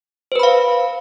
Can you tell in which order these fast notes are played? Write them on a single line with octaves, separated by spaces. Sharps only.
C5 B4 B5 F5